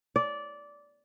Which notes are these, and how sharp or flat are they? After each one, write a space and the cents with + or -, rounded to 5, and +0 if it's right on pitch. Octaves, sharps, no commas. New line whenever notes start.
D5 -15